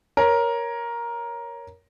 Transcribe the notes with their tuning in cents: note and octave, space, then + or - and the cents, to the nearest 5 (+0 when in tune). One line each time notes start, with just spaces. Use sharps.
A#4 +10 C#5 +0